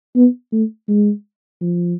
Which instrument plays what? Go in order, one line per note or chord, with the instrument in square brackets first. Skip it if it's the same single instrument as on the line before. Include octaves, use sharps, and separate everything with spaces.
[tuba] B3
A3
G#3
F3